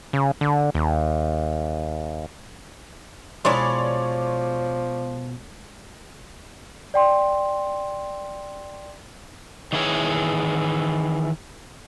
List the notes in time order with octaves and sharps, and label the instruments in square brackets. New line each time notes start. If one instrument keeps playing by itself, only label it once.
[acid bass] C#3
D3
D#2
[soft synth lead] B2 [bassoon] F3 [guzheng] G#3 E4 [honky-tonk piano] C#5 D5 C6
[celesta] D5 G5 C6
[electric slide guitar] D#3 E3 E4 G#4 C#5